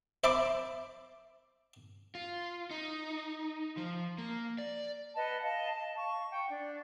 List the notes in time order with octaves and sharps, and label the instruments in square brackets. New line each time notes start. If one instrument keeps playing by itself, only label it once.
[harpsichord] C5 E5 A5 B5 D6
[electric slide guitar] F4
D#4
F3
A#3
D5
[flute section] B4 D#5 F#5 A5
D#5 F5 A5
A5
F5 C#6
F#5 G5
D4